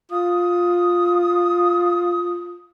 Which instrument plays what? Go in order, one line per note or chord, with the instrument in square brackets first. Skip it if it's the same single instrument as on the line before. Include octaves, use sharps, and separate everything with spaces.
[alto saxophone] F4 [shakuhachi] D#6